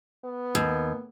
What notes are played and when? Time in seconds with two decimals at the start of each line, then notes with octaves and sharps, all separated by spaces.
0.24 B3
0.55 D#2